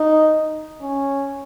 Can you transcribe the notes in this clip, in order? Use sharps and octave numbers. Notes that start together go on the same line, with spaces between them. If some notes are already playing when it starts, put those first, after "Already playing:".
Already playing: D#4
C#4